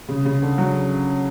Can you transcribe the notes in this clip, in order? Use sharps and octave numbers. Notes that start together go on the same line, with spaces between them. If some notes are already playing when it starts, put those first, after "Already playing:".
C#3
C#3
D3
F#3